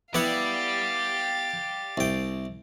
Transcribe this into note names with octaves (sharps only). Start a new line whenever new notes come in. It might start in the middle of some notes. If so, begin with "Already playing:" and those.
B3 E4 G4 D5 F5 F#5 A6
C2 G5